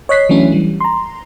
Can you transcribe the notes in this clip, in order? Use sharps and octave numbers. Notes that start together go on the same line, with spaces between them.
C#5 D#5 F#6 B6 C7
E3 F#3 A3 C#4 D4 E4
E3 G3
A#5 C6